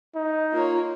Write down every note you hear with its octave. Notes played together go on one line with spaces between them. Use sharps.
D#4
A#3 F4 C#5